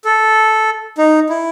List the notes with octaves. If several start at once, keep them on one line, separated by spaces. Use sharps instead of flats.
A4
D#4
E4